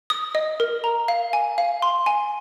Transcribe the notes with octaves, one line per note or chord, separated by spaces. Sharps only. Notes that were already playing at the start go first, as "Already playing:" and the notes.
D#6
D#5
A#4
A#5
F5
G#5
F5
C6
G#5